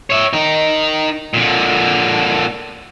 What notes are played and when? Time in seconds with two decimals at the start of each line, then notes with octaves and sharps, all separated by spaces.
0.10 C#5 E5
0.33 D#4 A#4
1.34 A#2 D3